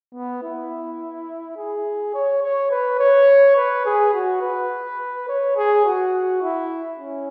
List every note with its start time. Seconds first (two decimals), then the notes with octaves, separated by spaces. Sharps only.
0.14 B3
0.43 E4
1.57 G#4
2.14 C#5
2.43 C#5
2.71 B4
2.99 C#5
3.56 B4
3.86 G#4
4.14 F#4
4.42 B4
5.28 C#5
5.56 G#4
5.85 F#4
6.42 E4
6.99 C#4